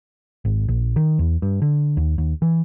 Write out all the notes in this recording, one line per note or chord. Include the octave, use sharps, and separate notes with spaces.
G#1
A#1
D#3
E2
G2
D3
D#2
D#2
E3